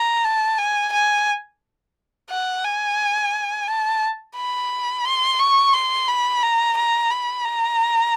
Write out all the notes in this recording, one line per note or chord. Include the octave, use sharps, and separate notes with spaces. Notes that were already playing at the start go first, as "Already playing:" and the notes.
Already playing: A#5
A5
G#5
G#5
F#5
G#5
A5
B5
C6
C#6
C6
B5
A#5
A#5
B5
A#5